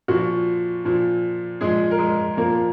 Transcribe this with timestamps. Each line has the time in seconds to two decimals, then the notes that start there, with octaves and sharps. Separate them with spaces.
0.08 A#2 F3 F#4
0.85 A#2 F3
1.61 A#2 F3 G#3 G#4
1.91 A#4
1.99 G#3 G#4
2.37 A#2 F3 A#3 A#4